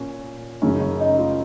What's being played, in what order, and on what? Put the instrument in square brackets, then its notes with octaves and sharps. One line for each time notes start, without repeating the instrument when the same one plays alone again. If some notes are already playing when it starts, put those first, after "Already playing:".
Already playing: [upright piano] A#2 C#4
F#2 C#3 G#3 C#4
C#4
D#4
F4